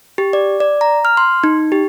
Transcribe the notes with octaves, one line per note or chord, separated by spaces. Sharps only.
G4
D5
D5
A#5
F6
C6
D#4
G4